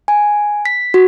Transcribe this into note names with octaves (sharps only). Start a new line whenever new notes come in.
G#5
B6
F#4